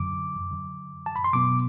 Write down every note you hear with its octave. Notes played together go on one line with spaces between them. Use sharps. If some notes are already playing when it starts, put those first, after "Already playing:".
Already playing: F#2 D3 F#3 D6
F#2 D3 F#3
A5
B5
C6
B2 F#3 B3 D6